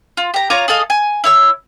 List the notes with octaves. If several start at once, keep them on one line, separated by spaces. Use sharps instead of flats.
F4
G4 A#5
F4 C#5 A#5 D6
G#4 A4 D#5 F5
G#5
E4 C#5 E6